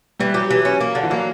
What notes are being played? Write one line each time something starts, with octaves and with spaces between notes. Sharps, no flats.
E3 G3
F#3 G4
E3
C#4
A#3
D3
E3
F#3 A#3